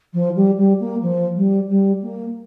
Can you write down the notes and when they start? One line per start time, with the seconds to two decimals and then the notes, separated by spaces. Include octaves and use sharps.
0.14 F3
0.36 G3
0.58 G3
0.80 A#3
1.02 F3
1.36 G3
1.69 G3
2.02 A#3